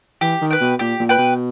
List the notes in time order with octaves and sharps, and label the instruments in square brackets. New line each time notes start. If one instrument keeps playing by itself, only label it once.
[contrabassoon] E3 [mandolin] G4
[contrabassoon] D#3
[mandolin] B4 G5
[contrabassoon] B2
[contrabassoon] A#2 [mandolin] G4
[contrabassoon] A#2
[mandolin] B4 G5
[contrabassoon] B2